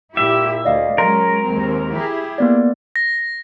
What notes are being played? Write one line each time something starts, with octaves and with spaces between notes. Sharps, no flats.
A#2 E4 G4 E5
D2 D5 D#5 F5
F#3 G#3 C#4 A#4 C6
D#2 G#3 C4
E4 G4 G#4
A#3 B3 D5
A#6